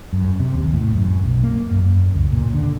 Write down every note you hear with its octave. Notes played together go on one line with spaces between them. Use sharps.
F#2
C3
D#2
A2
F#2
B1
A#3
F#2
C#2
A#2
D3